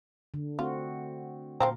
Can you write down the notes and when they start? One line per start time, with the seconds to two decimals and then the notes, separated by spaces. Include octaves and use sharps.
0.34 D3
0.59 A3 C4 F4 F#4
1.60 A#2 F3 C4 F5 A#5